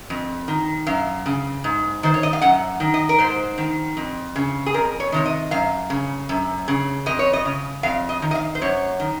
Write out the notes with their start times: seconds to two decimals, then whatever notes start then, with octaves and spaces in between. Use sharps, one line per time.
0.10 F2
0.48 D#3
0.87 F#2 F5
1.26 C#3
1.64 G#2
2.03 D#3 C5
2.14 C#5
2.23 D#5
2.33 F5
2.41 F#2 F#5
2.80 D#3
2.94 D#5
3.09 A#4
3.19 G#2 C5
3.58 D#3
3.97 F2
4.36 C#3
4.66 G#4
4.74 F2 A#4
5.00 C#5
5.12 C3 D#3 C#5
5.25 D#5
5.51 F#2 F5
5.90 C#3
6.29 F#2
6.68 C#3
7.06 F2 D#5
7.19 C#5
7.33 D#5
7.45 C#3
7.83 F2 F5
8.09 D#5
8.22 D#3
8.31 D#5
8.35 F5
8.55 C5
8.61 F#2 C#5
9.00 D#3